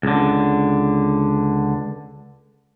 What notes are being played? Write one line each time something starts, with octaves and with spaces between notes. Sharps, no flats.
C#2 D3